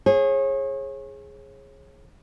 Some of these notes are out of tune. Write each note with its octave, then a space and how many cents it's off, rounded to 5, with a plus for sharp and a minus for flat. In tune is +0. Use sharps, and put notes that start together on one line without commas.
G#4 +0 C#5 -35